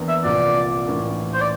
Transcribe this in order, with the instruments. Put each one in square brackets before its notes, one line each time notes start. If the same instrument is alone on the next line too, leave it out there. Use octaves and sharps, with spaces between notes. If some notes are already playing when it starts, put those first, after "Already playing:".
Already playing: [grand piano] E2 E3 A#3 D4
[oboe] E5
[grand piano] C2 A#2 F3 [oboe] D5
[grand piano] A1 A2 E3 A#3 D4
[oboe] C5
D5